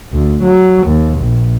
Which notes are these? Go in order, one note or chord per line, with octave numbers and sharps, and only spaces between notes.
D2
F#3
D#2
A#1